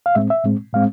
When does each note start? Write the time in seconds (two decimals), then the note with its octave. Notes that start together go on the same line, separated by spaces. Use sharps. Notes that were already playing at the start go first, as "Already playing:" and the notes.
0.06 F5
0.15 A2 G#3 C4 E5
0.30 E5
0.44 A2 G#3 C4
0.73 A2 G#3 C4 F5